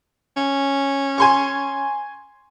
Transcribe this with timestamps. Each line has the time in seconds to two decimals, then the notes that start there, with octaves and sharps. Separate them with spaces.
0.37 C#4
1.18 G#5 C6 C#6